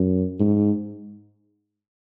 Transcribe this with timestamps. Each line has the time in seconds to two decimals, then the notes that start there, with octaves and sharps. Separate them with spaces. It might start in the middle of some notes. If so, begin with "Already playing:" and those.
Already playing: F#2
0.40 G#2